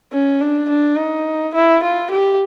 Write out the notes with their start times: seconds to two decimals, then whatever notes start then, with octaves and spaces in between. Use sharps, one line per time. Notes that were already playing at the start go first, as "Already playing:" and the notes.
0.13 C#4
0.41 D4
0.70 D4
0.98 D#4
1.55 E4
1.83 F4
2.11 G4